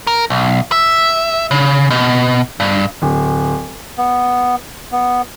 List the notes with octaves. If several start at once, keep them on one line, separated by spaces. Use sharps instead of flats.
A#4
B1
E5
C#3
B2
G2
D1
B3
B3